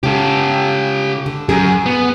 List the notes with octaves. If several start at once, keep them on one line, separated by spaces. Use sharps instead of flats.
C#3 G#3 G4 A4
D3
F#2 G#4
B3